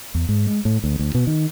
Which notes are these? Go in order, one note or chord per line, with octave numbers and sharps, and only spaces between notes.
E2
G#2
G#3
A2
D2
D2
B2
D#3